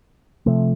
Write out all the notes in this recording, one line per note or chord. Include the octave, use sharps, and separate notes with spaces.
C3 F3 A3